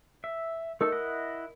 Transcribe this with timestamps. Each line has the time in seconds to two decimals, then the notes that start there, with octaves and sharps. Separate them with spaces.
0.24 E5
0.81 A3 D#4 A4 A#4
0.92 E4 D#5 F#5